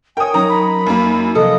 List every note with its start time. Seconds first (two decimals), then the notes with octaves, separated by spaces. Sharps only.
0.17 A#4 C#5 G5 G#5 D#6
0.34 F#3 C#4 D#4 A#5 D#6
0.49 B5
0.87 F#2 A#3
1.35 C3 F3 A4 D#5 D#6